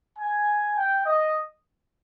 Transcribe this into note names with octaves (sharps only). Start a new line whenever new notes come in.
G#5
G5
D#5